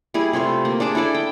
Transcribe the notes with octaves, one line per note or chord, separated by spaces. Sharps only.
G3 E4 G#4
C3 A3 F4 F5
A#3
D4 G#4 A5 D6
E4 G#4 A4 D5
G5